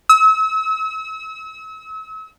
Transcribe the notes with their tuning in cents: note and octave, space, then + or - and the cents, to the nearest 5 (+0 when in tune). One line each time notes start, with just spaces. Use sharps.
E6 -40